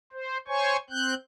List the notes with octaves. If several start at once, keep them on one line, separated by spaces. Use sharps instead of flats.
C5
C5 C#5 G#5 C#6
C4 F#6 G6